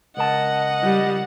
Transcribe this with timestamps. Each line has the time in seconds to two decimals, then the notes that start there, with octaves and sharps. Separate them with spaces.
0.17 C#2 A#4 D#5 F#5 A5
0.83 G3